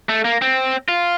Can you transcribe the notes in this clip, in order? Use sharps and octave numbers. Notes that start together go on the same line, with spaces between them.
A3
A#3
C4
F4